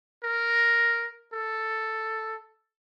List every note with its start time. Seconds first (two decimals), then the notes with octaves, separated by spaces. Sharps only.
0.23 A#4
1.33 A4